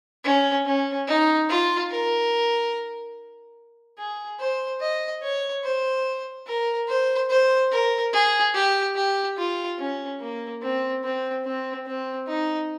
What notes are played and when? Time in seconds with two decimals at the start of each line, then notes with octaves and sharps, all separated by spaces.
0.25 C#4
0.66 C#4
1.08 D#4
1.49 F4
1.91 A#4
3.98 G#4
4.40 C5
4.81 D#5
5.23 C#5
5.64 C5
6.47 A#4
6.88 C5
7.30 C5
7.72 A#4
8.13 G#4
8.54 G4
8.96 G4
9.38 F4
9.79 C#4
10.20 A#3
10.62 C4
11.04 C4
11.45 C4
11.86 C4
12.27 D#4